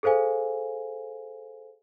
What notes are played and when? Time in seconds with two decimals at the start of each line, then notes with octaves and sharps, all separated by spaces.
0.03 G#4 A4 C5 F5 G#5